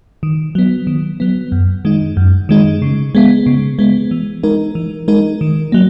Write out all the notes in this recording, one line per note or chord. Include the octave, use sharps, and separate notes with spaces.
D#3
F#3 B3
D#3
F#3 B3
F#2
D#3 G#3 D#4
F#2
D#3 G#3 D#4
C#3
G#3 B3
C#3
G#3 B3
E3
G#3 D#4 A#4
E3
G#3 D#4 A#4
D#3
F#3 A#3